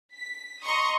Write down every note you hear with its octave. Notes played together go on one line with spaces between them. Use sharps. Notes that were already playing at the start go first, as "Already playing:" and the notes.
B6
D#5 A#5 C6 C#6 D#6